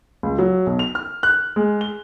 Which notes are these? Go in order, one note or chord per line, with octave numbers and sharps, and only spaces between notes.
C#2
F#3
B1
F7
F6
F#6
G#3
G7